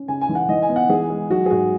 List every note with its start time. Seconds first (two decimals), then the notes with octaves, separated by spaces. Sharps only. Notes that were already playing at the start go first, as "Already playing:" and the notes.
Already playing: C#4
0.08 C#3 G#5
0.21 G#5
0.29 E3
0.35 F#5
0.49 E3 D#5
0.62 G#5
0.69 B3
0.76 F#5
0.89 E3 G#4
1.10 G#3
1.30 F#3 F#4
1.46 G#4
1.51 G#2 F#4